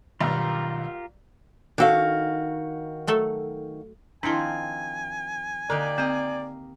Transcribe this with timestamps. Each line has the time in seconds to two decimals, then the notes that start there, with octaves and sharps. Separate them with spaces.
0.21 B1 G2 B2 D#3 G3 F4 G4 A#4
1.78 D#3 D4 F#4 A4 F5
3.07 F#3 A3 A4
4.23 D#3 F3 C4 D4 E4 G#5 C6
5.70 D3 A#3 D#4 G4 D5
5.98 A#3 C4 D#5